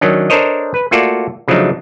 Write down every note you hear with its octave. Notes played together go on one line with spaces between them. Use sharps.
D#3 F#3 C#4 D4
D4 A4 A#4 C5 C#5 D#5
B4
A3 A#3 F4 F#4 A4 D5
C#3 F3 F#3 A3 D4 D#4